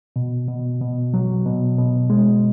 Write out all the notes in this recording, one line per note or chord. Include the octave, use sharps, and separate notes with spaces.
B2
B2
B2
F#3
B2
B2
G#3